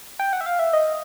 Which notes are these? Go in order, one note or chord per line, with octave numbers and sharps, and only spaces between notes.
G5
F#5
E5
F5
E5
D#5